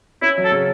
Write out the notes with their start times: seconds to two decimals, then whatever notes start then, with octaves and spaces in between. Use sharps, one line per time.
0.22 C#4 E4
0.38 F#3
0.45 A4
0.52 C#3